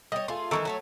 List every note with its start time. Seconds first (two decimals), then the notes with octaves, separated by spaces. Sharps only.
0.12 G3 C#5 D#5
0.28 A3 F4 G#4 C6
0.51 D#3 E3 G3 A4 A5 C#6
0.65 F#3 A3 C#5